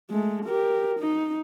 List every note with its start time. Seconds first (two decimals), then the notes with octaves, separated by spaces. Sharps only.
0.10 G#3 A3
0.45 G4 A#4
0.99 D#4